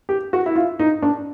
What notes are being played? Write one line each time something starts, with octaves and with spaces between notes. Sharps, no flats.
G4
F#4
E4
F4
D#4
D4